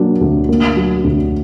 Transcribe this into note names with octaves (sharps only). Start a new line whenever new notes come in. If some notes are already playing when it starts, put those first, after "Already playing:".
Already playing: F#3 A#3 D4
D2
A#3
F#3
D2